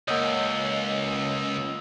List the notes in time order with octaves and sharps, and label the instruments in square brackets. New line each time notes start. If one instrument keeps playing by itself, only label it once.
[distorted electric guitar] C#2 [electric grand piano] A#3 C#5 [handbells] D#5 F#5 [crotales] D#6 E6 G7